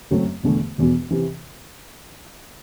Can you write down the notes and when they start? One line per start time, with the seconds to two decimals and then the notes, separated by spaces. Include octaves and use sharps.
0.11 F#1 F#2 F#3 A3 C4
0.44 E1 E2 D3 A3
0.78 E1 E2 B2
1.11 C3 E3